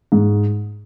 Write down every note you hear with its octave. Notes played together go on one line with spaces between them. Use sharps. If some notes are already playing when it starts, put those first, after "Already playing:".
G#2